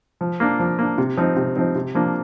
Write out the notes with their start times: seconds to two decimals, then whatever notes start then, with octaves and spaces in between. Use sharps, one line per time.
0.21 F3
0.40 A#3 D4
0.59 F3
0.79 A#3 D4
0.98 C3
1.17 F3 C4 D#4
1.36 C3
1.56 F3 C4 D#4
1.75 C3
1.95 F3 A#3 D4